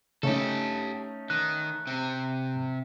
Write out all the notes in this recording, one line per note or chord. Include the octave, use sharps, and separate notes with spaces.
C#3 A3 C#4 D#4 G4 A4
D#3 F#6
C3 C4